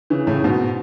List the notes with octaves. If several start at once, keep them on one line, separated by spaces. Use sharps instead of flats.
C#3 E3
A2 C#3
G#2 B2